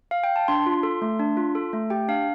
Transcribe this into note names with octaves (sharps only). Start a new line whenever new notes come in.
F5
G5
A5
D4 C6
F4
A4
A3
D4
F4
A4
A3
G4 G5
D4 F5